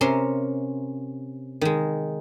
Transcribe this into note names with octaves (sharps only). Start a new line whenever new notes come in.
C3 C#4 A#4 E5 C6
D#3 G#3